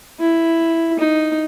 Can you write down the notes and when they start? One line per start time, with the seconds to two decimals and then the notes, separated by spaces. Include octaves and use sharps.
0.20 E4
0.99 D#4